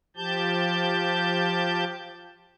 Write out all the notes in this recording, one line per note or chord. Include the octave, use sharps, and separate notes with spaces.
F3 G4 A5 G6